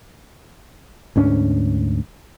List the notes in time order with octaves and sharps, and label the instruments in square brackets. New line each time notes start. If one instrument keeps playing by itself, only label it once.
[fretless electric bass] D2 G#2 C#4 D4